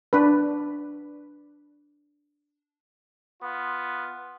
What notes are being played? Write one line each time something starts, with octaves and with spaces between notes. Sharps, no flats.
D4 B4
B3 F4